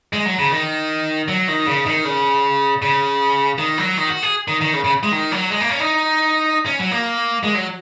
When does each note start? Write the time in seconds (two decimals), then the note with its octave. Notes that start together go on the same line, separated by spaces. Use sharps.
0.13 G#3
0.26 F#3
0.38 C#3
0.52 D#3
1.28 F#3
1.48 D#3
1.66 C#3
1.86 D#3
2.05 C#3
2.82 C#3
3.58 D#3
3.78 F#3
3.97 D#3
4.09 F#4
4.23 G#4
4.48 D#3
4.61 D#3
4.73 C#3
4.84 C#3
5.03 G#3
5.12 D#3
5.32 F#3
5.50 G#3
5.60 A#3
5.69 C#4
5.80 D#4
6.66 C#4
6.79 F#3
6.91 A#3
7.43 G#3
7.55 F#3